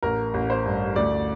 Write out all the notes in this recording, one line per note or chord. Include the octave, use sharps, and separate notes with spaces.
A1 A#4
A1
C5
G2
D2 D5